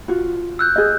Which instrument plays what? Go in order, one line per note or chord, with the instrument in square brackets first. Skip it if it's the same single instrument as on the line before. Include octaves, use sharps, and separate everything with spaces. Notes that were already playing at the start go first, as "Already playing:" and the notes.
[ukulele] F4 F#4
[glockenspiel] E6 F#6 G6
[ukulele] G#4 D#5